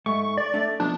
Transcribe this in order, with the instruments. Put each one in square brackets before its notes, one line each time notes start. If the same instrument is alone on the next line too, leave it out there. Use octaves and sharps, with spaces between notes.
[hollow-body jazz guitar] G#2 A3 [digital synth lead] C#6
[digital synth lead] D5
[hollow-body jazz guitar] A3 D4
[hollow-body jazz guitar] F2 B2 F3 [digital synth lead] D4